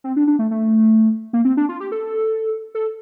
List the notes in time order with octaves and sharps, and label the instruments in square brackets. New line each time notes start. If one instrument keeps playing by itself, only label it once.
[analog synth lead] C4
D4
D4
A3
A3
A#3
C4
D4
F4
G4
A4
A4